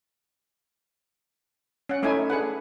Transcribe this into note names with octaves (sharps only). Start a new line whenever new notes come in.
C#4 F#5
A3 C#4 D#4 E4 G#5
D4 G#4 B4 F#5